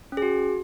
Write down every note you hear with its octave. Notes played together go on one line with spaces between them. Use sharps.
C#4
G#4
F#4